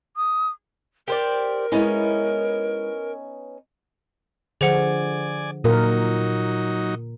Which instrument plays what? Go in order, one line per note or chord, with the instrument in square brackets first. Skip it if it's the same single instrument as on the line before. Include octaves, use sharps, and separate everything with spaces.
[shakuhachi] D#6
[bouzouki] G4 C5 D5 [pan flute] A#4
[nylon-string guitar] G#3 E4 [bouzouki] B3 C#4 D#4
[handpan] D3 F3 [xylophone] G#4 C5 F#5 [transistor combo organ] D5 G#5
[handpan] A#2 A#4 [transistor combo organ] F#3 D#4